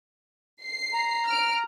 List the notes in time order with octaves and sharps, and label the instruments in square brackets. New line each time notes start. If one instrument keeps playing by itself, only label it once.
[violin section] C7
[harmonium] A#5
[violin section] F6 D7